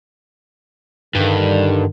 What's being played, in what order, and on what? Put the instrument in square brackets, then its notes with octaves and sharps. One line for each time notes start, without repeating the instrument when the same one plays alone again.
[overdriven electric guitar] G2 [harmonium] D3 D#3